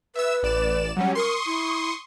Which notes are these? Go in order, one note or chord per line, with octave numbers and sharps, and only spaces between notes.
B4 E5 E6
A1 D5 E7
F#3 G3 C#4 F#5
A#4 C6 C#6 D#6
E4